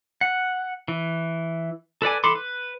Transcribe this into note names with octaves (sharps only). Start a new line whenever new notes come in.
F#5
E3
A4 B4 D5 G#5
E3 A4 B5 C6 D6
B4